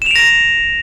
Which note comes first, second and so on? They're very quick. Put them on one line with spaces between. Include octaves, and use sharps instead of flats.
E7 F7 D7 A#6